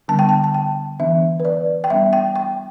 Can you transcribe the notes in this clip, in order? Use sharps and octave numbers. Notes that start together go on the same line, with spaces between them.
D3 G3 B3 D4 A5
G5
A5
A5
G5
E3 B3 D4 E5
B4
D5
G5
G3 B3 D4 E5
G5
G5